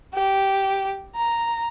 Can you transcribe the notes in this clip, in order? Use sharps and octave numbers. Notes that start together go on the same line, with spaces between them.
G4
A#5